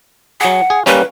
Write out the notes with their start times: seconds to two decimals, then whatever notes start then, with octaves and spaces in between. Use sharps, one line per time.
0.41 F#3 G#4 F#5
0.70 G#4
0.86 G3 A#3 C#4 B4